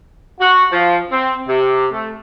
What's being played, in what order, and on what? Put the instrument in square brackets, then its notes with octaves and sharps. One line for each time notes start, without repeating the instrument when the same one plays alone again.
[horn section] F#4
F3
C4
C3
A3